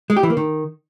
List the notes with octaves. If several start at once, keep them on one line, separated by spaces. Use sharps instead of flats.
G#3
G4
E3
A#3
D#3